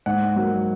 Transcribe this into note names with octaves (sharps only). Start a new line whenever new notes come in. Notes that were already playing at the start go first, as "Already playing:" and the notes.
G#2 F#5
F#3 A#3